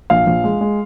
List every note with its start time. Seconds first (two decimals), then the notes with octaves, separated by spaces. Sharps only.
0.10 A#1 F5
0.27 A#1
0.44 G#3
0.61 G#3